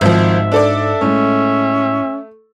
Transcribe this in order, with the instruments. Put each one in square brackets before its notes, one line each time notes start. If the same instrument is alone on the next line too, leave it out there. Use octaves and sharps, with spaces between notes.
[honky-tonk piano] G#1 F3 [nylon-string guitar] G#2 F#4 [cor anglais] E5
[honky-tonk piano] D4 A4 D5
[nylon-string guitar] A2 G#3 [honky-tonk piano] A3 [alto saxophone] C#4